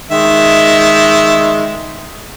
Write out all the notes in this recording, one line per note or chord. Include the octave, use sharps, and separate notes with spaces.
D#3 G#3 E5